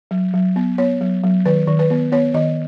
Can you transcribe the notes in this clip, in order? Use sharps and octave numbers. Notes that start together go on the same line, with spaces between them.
F#3
F#3
B3
B3 C#5
F#3
F#3
D#3 B4
D#3
B4
B3
B3 C#5
D#3 D#5